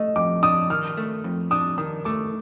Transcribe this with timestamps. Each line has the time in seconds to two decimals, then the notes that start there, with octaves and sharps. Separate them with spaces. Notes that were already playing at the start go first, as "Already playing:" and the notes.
Already playing: A3 D#5
0.16 F2 D6
0.43 D4 D#6
0.70 D#3 F6
0.97 A3
1.24 F2
1.51 D4 D#6
1.78 D#3 D#6
2.05 A3 D6